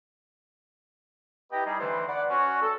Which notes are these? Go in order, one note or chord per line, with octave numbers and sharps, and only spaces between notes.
E4 G4 B4 D#5 G5 A#5
G3 D#4 G#4
D3 E3 A3 B4 C5
D5 F#5
C#4 F#4
A4